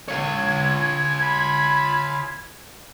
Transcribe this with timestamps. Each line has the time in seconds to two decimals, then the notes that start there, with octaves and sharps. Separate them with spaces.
0.08 F4 C#5 G#6
1.22 B5